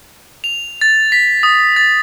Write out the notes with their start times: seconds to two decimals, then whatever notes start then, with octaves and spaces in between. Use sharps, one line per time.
0.44 F7
0.81 A6
1.12 B6
1.43 D#6
1.76 A6